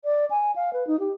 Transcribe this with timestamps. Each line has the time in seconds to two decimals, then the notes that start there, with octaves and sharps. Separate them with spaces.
0.04 D5
0.30 G#5
0.56 F5
0.73 B4
0.87 D#4
1.00 G4